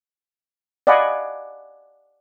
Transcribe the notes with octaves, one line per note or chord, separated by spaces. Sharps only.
D5 D#5 F5 F#5 G#5 B5